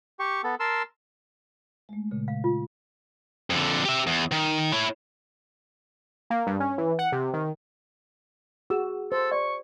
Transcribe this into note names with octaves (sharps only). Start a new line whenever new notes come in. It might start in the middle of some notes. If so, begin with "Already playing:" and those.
G4 C#6
B3 A4
A#4 A5 C6 E6
G#3 A3
A#2 C#3
F5
F4
F2 D3
G4 E5
E2
D#3
E4 C#5
A#3
G2
C#4
E3
F#5
C3
D#3
F#4 G#4 E6
A4 C5
D5 C#6